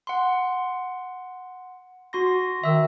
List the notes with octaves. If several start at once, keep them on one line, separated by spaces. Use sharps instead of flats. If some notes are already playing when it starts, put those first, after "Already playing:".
F#5 C6
F#4 C6 A#6
D#3 E5 E6